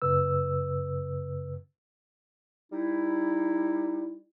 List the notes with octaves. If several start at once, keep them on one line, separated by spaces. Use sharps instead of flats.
F#2 C#3 B4 E6
G3 D#4 E4